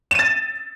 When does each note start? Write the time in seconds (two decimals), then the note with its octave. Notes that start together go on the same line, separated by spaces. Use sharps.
0.11 E7
0.15 D#7
0.19 A6